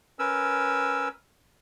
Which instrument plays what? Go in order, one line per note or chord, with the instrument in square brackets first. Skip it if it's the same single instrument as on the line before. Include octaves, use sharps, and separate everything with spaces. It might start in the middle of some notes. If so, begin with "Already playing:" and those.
[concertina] C#4 A#4 B4 E6